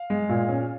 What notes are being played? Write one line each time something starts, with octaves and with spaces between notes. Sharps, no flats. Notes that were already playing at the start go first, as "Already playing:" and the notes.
Already playing: F5
G#3
A#2
C#4